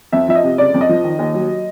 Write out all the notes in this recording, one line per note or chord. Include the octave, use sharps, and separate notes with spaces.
F2 E5
F3 E5
D#5
C3
F#1 D5
F2
D#5
F3
D#3
D#2
F#3